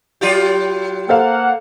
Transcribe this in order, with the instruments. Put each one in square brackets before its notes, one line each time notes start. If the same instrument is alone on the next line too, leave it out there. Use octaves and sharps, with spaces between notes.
[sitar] F#3 F4 G4
[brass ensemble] A#3 F#5 [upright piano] A4 C5 F5